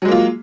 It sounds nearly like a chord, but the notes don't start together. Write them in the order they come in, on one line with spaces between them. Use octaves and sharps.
F#3 G#3 A#3 F4